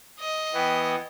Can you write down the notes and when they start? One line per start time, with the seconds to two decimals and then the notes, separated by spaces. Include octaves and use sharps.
0.19 D#5
0.54 E3 B3 G5